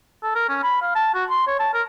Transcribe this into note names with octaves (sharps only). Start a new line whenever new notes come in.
A4
A#4
C#4
B5
F5
A5
F#4
C6
C#5
A5
A#4